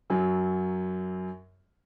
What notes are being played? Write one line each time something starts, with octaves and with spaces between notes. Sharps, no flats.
F#2 F#3